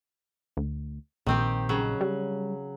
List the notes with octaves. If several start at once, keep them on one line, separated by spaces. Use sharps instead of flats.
D2
A#1 D#3 C4 G4
C#3 F#3
G3